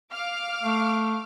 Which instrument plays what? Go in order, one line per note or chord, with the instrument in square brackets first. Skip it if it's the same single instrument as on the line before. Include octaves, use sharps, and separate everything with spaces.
[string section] F5 D6 F6
[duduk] A3